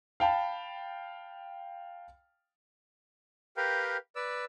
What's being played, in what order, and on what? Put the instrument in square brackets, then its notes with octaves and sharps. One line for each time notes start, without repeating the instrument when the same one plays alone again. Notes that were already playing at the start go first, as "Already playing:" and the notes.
[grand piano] F5 G5 A5 B5
[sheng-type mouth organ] G4 A#4 B4 F5 G5
B4 D5 E6